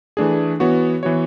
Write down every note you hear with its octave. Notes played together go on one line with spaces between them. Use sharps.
E3 A3 D4 G#4
E3 B3 F#4 C#5
E3 B3 F#4 C#5